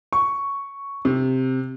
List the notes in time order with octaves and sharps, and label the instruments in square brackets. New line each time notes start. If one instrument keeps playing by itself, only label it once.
[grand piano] C#6
C3